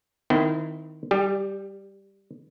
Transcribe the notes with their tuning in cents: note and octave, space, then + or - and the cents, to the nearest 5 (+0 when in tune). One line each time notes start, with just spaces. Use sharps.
D#3 +0 C4 -35 E4 +0
G3 +0 G4 +40